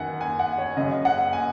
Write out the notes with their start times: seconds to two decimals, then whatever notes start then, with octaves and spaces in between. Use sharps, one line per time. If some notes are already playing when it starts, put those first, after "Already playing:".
Already playing: F#2 D#3 F#5 G#5
0.21 G#5
0.39 F#5
0.58 C#5
0.77 F#2 C#3 D#5
1.05 F#5
1.33 G#5